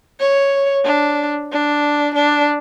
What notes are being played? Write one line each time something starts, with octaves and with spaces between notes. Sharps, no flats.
C#5
D4
D4
D4